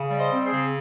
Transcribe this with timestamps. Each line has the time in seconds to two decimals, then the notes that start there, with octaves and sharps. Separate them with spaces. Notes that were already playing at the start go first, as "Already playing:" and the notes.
Already playing: C#3
0.11 G3
0.17 C5 D#5
0.31 C4
0.45 G#4 C5
0.52 C#3